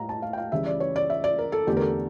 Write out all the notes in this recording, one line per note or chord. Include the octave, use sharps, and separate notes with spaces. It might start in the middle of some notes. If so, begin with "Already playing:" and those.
Already playing: A2 G3 F5 A#5
A5
F5
G5
F5
C#2 C#3 E3 G3 E5
D5
C#5
D5
E5
D5
A#4
A4
E2 D3 A3 G4
A#4
A4